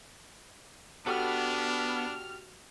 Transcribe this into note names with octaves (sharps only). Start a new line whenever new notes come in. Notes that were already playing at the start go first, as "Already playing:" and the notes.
B3 D4 F#4 G4 A4 F6